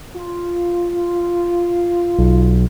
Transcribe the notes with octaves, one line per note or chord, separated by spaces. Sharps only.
F4
B1